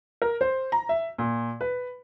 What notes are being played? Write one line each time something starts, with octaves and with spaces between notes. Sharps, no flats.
A#4
C5
A#5
E5
A#2
B4